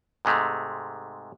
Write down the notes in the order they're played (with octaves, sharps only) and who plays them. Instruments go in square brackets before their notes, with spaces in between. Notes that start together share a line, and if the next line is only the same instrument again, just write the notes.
[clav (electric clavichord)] G#2 C3 G#3 A3